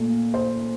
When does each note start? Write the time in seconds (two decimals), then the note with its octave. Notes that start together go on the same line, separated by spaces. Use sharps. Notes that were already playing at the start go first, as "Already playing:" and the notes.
Already playing: A#2 A3
0.34 C5